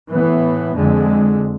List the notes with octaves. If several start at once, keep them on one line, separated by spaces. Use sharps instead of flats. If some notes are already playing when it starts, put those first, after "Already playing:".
A2 E3 B3
F2 D3 G#3